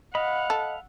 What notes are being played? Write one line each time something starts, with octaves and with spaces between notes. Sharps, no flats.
D#5 F5 F#5 B5
A4